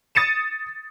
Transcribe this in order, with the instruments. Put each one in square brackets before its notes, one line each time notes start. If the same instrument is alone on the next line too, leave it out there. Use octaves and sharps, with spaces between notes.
[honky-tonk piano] D#6 A6 C#7 D#7 E7